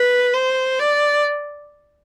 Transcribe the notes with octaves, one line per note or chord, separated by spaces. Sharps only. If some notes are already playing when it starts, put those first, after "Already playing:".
Already playing: B4
C5
D5